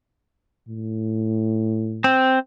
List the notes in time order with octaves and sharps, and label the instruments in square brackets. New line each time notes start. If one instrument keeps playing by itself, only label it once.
[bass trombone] A2
[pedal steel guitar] C4